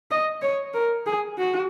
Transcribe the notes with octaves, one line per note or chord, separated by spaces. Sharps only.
D#5
C#5
A#4
G#4
F#4